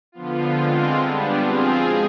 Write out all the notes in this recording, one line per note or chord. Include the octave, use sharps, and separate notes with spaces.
D3 F3 B3 F4
D3 G#3 C4 F4
G3 B3 D4
F3 C4 F4 G#4
B2 G#3 G#4